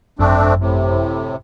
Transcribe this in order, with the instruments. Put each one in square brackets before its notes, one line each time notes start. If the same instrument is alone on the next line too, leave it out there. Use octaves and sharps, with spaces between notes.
[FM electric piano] G#1 F#2 [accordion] A3 C4 D4
[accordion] A2 C3